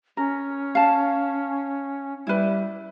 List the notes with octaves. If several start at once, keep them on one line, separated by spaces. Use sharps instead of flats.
C#4 A#4
F5 A5
G3 E4 B4